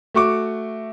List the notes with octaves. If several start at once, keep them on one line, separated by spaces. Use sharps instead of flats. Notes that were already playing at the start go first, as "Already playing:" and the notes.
A3 F#4 C#6 D6